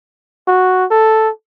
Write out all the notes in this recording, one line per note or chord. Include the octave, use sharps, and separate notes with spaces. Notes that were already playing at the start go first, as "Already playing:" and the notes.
F#4
A4